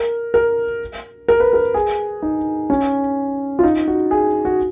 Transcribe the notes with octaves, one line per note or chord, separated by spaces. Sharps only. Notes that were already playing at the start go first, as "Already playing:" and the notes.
Already playing: A#4
A#4
A#4
B4
A#4
G#4
D#4
C#4
F4
D#4
F#4
G#4
F#4